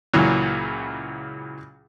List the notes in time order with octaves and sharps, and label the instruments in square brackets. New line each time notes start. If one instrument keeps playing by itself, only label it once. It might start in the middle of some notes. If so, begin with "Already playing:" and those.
[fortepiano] C#2 A#2 E3 F#3